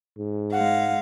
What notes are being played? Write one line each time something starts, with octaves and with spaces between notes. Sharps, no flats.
G#2
G#3 F5 F#5